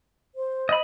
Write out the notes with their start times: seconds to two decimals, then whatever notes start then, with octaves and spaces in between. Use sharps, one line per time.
0.35 C5
0.69 D#5 B5